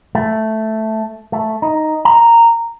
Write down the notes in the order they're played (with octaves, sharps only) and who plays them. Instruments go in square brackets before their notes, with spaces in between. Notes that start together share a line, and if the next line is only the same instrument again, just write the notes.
[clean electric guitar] A3
A3
D#4
A#5